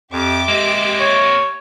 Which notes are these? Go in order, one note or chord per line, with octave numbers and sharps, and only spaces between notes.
F2 G4 E5 D6
G#3 A#3 C4
C#5